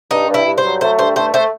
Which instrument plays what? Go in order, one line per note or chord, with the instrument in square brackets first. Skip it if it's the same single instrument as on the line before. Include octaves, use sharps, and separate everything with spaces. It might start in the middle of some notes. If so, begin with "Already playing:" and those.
[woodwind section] G2 [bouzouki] D#4
[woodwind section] G2
[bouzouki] E4
[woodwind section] G2
[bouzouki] C5
[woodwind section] F#3
[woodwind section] A3 [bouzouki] C5
[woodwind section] G2 [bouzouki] C5
[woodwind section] A3 [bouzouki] C5
[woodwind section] A3 [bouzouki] C5